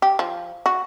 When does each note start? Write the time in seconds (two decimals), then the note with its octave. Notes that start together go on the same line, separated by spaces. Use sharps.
0.02 G4
0.19 F3
0.66 F#4